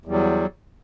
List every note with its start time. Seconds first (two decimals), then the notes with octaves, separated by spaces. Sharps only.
0.05 E2
0.08 G3
0.11 F#3